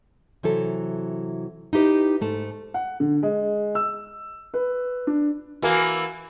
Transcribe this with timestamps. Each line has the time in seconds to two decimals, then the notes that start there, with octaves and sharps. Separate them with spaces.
0.43 C3 E3 F#3 A4
1.73 D#4 E4 G4 B4 D#5
2.21 G#2 A3 A5
2.74 F#5
3.00 D3
3.23 G#3
3.75 E6
4.54 B4
5.07 D4
5.62 E3 A#3 F#4 A#4 G#5